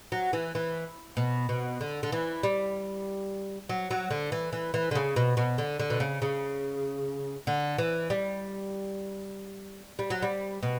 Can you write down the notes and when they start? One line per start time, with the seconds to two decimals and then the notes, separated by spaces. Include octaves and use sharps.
0.12 F#3
0.33 E3
0.55 E3
1.17 B2
1.49 B2
1.81 D3
2.03 D3
2.12 E3
2.43 G3
3.69 F#3
3.91 F#3
4.11 D3
4.32 E3
4.53 E3
4.74 E3
4.91 D3
4.95 C#3
5.16 B2
5.37 B2
5.58 D3
5.80 D3
5.90 B2
6.00 C#3
6.22 C#3
7.47 D3
7.78 E3
8.10 G3
9.99 G3
10.10 F#3
10.22 G3
10.63 B2